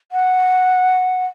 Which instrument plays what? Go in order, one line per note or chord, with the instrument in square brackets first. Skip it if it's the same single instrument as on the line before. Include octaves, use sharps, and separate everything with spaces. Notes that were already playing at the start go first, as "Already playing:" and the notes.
[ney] F#5